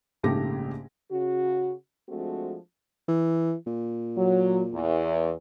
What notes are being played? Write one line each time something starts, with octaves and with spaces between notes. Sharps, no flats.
A#1 G#2 C#3 A3 G4 A#6
C#3 F#4
F3 G#3 A3 C4 D4 F#4
E3
A#2
F#3
E2